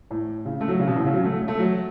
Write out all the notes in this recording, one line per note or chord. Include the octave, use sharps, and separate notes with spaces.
A2
C#3
A3
F#3
C#3
B2
A2
C#3
F#3
A3
A3
F#3